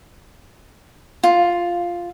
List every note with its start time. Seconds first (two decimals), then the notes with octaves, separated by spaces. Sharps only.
1.23 F4